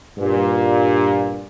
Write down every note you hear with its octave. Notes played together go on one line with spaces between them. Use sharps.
G2 A#2